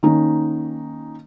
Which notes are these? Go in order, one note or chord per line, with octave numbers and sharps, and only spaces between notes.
D#3 A#3 C#4 D#4